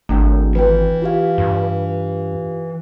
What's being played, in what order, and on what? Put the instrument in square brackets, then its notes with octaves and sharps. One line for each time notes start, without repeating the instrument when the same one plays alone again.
[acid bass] G#1 [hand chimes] A3 D4 G5
[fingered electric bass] E3 [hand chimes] B4 G5
[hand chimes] F4 G4 F5
[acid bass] G2